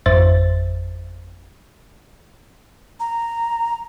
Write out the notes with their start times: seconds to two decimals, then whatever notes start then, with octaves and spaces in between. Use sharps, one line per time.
0.06 G#1 F2 C5 E5 A6
3.00 A#5